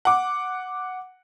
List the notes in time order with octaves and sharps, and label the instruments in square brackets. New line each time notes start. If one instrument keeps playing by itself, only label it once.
[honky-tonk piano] F#5 D6